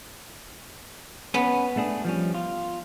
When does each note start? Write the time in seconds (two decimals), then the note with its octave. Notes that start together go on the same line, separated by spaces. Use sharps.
1.34 B3 C#4
1.77 A3 D4 G#4
2.05 F3 G3 C#4
2.34 F4